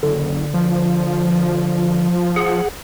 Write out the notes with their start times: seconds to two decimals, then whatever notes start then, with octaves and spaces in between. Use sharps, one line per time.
0.03 F#1 D3
0.54 F3
2.36 G#4 F#5